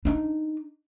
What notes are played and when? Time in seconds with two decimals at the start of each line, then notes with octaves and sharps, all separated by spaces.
0.05 D4 D#4